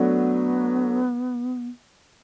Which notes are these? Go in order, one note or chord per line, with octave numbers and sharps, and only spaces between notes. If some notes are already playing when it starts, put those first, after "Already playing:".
Already playing: F#3 A3 B3 D4 F#4